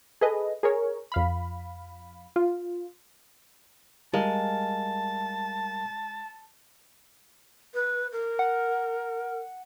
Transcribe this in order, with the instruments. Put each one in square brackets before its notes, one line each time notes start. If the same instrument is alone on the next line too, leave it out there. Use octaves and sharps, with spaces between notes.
[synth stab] G#4 A4 B4 D#5
G#4 A#4 C#5
F2 F5 B5
F4
[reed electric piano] G3 A#4 F5 [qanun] G#3 [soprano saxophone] A5
[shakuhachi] B4
A#4
[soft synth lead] F#5